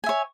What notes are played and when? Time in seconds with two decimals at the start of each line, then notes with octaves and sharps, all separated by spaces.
0.04 G#5
0.06 E5
0.09 C#5